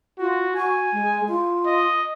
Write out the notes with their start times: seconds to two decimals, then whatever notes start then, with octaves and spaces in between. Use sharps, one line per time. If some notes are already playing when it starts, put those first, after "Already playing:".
0.19 F4 F#4
0.56 F#4 G#5
0.92 G#3
1.27 F4
1.67 D#5